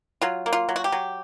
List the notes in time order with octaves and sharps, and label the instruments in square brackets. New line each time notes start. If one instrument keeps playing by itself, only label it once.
[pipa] F#3 F4
A#3
F4
F#3
F#4
G4
F#3